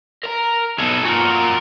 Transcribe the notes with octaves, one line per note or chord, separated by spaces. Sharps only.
A#4 A#5
B1 B2 G#4 A4
A#2 F#4 A#4